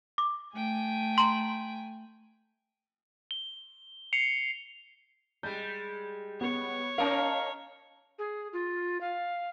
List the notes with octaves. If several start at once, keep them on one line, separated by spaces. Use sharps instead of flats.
D6
A3 G5 G#5
A#5 C6
G7
C7 C#7 F7
G3 G#3 G6
B3 C#5
C#4 D#4 A#4 F5 A5
G#4
F4
F5